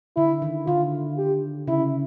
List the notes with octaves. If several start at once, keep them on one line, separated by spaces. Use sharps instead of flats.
D3 E4
D#3
D3 F4
G4
C#3 E4